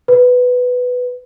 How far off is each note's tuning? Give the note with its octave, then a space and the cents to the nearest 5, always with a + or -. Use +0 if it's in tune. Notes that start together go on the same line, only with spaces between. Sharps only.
B4 +5